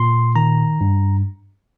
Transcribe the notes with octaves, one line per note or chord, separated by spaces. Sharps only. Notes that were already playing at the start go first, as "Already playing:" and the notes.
Already playing: A#2 C6
D#3 A#5
G2